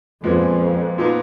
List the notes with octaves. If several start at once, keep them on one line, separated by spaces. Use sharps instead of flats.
F2 A#2 F3 G#3 B3
A#2 F3 B3 D#4